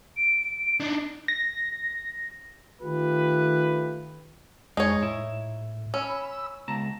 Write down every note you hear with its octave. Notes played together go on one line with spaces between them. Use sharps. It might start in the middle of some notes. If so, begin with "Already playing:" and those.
D7
D4 D#4
A#6
D#3 A3 F4 G4 B4
F2 G#3 D#4 C#5 G#5
A2 E4
C#4 B5 E6
C#2 G#3 B3 A5 A#5